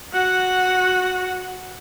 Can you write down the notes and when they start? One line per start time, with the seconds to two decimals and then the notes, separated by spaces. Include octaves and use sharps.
0.13 F#4 F#5